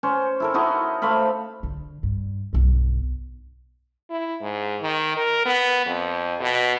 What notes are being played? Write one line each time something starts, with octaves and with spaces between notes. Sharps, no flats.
C#4 C5
E4 A4 A#4
D#4 E4 F#4 D#5
A3 C5 F5 B5
D3
G2
B1 G2
E4
G#2
D#3
A#4
B3
F2
B2